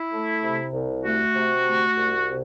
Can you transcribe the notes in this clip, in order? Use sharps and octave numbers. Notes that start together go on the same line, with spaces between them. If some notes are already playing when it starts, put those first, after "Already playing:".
Already playing: E4
A3
C3
C2
A3 F#4
C3
A3
C2
C3